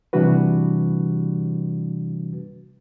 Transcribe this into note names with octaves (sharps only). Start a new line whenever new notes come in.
C3 E3 G3 D4 F#4 B4